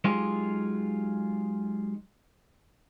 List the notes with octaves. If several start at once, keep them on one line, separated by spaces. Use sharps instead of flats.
F#3 G#3 D#4 F4 G4 G#4